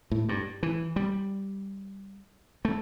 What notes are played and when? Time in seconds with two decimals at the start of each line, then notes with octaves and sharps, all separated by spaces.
0.11 A2
0.29 G2
0.63 E3
0.96 G3
2.65 A3